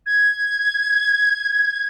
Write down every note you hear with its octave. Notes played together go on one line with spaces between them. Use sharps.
G#6